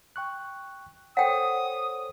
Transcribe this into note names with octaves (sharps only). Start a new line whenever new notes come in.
G5 C#6 F#6
A4 C5 C#5 F#5 G5 D#6